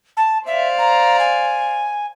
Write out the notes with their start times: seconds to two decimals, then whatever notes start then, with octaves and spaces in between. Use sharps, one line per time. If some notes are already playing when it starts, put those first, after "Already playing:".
0.17 A5
0.46 C5 D5 E5 F5
0.78 A#5
1.19 G#5